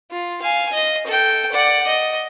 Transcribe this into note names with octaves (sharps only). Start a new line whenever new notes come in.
F4
F5 G#5
D#5
A4 G5
D5 F#5
D#5